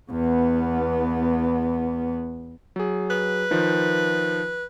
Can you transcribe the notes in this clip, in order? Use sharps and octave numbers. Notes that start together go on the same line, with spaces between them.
E2 B3
F#3 G#4
B4
D#3 F3